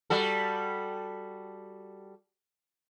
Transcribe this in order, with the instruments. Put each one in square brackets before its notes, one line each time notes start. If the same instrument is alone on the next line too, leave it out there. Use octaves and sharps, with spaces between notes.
[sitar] G3 F#4 A4